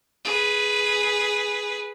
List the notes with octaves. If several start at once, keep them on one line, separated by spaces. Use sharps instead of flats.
G#4 B4